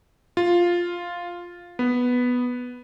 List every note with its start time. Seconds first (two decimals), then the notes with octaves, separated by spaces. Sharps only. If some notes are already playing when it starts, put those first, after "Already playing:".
0.37 F4
1.79 B3